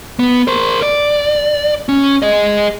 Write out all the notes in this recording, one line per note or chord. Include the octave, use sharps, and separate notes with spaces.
B3
A#4 C5
D5
C#4
G#4 D#5